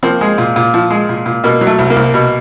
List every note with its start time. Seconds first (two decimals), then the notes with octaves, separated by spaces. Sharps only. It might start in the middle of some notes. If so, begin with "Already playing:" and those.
0.03 F3 A#3 C4
0.21 G#3
0.38 A#2
0.56 A#2
0.74 F3
0.91 G#3
1.09 A#2
1.26 A#2
1.44 B2 A#3
1.61 F#3
1.67 A3
1.78 C2
1.90 A#3
1.96 C2
2.14 B2